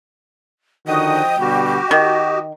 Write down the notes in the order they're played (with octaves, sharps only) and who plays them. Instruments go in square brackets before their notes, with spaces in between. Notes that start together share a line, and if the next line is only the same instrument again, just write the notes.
[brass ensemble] D3 D#3 F#4 [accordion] F3 D#5 D#6 [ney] G5
[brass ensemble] B2 D3 G3 [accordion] F#4 G4
[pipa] D#3 [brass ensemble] D#5